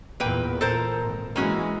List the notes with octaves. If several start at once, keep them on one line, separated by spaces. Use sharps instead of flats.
E2 A#2 A#3 B4 G5
A#2 A4 A#4 C5
G#1
E3 G#3 A#3 C#4 F#4